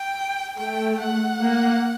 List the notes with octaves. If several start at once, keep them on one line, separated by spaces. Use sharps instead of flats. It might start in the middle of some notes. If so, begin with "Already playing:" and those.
Already playing: G5
A3 G5
F#5
A#3